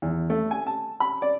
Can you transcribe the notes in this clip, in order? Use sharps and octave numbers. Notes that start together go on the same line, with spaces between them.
E2
A3
G#5
A5
B5
D5